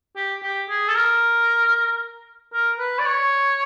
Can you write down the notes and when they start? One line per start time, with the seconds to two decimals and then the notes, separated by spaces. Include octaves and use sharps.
0.16 G4
0.43 G4
0.69 G#4
0.88 A4
0.95 A#4
2.53 A#4
2.78 B4
2.99 D5
3.05 C#5